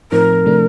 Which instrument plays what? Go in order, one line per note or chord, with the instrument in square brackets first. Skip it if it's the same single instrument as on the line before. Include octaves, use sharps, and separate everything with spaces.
[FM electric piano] A2 F3 C4 D#4 [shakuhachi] A#4
[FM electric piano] C3 F3 A3 D4